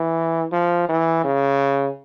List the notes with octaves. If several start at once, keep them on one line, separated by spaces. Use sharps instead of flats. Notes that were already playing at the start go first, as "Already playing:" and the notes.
Already playing: E3
F3
E3
C#3